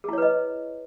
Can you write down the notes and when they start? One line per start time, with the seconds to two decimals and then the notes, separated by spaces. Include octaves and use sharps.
0.04 G#4
0.09 E4
0.13 C#5
0.18 B4
0.22 D#5